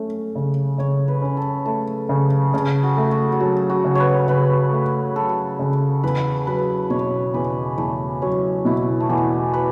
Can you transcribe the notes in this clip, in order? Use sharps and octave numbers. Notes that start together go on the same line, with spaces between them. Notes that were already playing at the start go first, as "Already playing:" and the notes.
Already playing: A3 C#4
C#3
C#3 C#5
B4
C#4
A4
A3 A4
C#3
C#3 A4
F#4
A3
F#4
F#4
F#3 A4
F#4
C#3
B4 C#5
C#3 B4
A3
F#3 A4
C#3
E2 B4
F#3 B4
B2 C#5
E2 B4
E2 A3
F#3 C#4
B2 E4
A3
E2 B3
B4